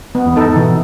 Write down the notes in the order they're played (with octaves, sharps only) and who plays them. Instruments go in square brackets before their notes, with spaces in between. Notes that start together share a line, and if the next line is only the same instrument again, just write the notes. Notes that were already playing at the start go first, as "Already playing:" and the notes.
[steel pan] B3
[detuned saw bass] E2
[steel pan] D#4 A4
[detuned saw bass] G#2
[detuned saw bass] B2 [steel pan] E3